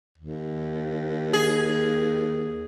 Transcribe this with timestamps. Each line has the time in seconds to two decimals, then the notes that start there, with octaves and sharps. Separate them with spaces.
0.18 D#2
1.33 G#4